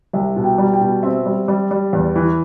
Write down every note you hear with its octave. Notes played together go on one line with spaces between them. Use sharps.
C2 E5
B2
G5
G3
G5
B2
C4 E5
G3
G3
G3
E2
E3